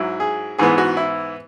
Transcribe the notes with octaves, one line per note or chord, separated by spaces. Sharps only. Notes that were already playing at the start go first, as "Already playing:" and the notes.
Already playing: G#2 F#3 E4
G#4
G#2 E3 B3 G#4
F#4
E4